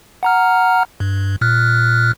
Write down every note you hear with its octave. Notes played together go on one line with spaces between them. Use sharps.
F#5 A#5 F6
G2
A#2 F6 F#6